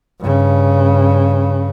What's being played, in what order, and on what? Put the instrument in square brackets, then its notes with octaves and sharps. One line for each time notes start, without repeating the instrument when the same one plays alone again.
[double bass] G2 C#3